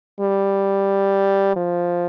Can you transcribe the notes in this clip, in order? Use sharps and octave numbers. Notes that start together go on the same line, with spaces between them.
G3
F3